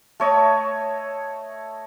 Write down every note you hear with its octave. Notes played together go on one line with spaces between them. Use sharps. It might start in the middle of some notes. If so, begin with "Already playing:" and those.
A3 C#5 D#5